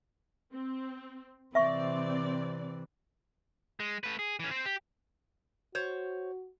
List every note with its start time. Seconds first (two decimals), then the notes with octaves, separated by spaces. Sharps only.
0.52 C4
1.55 C3 E3 C4 D5 E5 C#6
3.80 G#3
4.04 A3 B4
4.19 G#4
4.40 E3 C#4
4.51 C4 C5
4.66 G4
5.75 F#4 C5 C#5